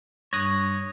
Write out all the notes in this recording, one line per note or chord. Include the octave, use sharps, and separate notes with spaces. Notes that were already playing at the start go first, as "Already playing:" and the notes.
G2 C#5 D#6 F#6 G#6 A#6